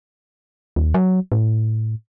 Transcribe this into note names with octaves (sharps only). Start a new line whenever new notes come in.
D#2
F#3
A2